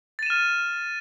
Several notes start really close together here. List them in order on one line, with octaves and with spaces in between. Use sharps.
A6 D#7 E7 F6